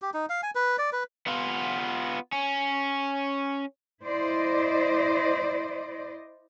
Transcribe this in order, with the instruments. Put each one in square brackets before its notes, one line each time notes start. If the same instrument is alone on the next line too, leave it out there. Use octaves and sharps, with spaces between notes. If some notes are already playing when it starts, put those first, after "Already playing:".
[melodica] G4
D#4
F5
G#5
B4
D5
B4
[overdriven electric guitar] B3 F4
C#4
[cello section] E4 C5 D5 D#5